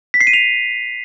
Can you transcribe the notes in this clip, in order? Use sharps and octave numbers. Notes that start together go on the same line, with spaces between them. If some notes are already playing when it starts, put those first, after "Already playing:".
B6
C7
D#7
F7